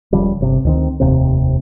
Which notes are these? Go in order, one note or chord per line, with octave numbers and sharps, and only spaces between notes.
E1 C#3 F3 G3
G1 C3
D2 D#3 C4
F1 D#2 C3 C4